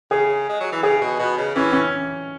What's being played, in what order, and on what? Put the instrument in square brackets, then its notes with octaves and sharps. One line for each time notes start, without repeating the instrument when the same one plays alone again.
[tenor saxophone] C#3 [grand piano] G#4
[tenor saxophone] G#3
F#3
E3
[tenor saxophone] C#3 [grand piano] G#4
[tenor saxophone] B2
B2
C#3
[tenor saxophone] E3 [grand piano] C#4
[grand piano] C#4